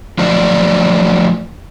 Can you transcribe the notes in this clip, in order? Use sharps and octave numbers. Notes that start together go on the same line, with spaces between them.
F3 F#3 A3 D4 F4 D5